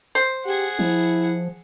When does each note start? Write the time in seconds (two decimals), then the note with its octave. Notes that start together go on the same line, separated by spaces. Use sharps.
0.15 C5
0.45 G4 G#4 F#5
0.79 F3 E4